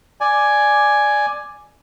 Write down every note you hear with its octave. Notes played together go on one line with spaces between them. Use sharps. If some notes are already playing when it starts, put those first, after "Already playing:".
D5 G#5